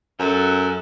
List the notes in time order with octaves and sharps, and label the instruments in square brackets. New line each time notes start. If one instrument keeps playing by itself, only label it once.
[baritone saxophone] F#2 [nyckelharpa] F#4 A4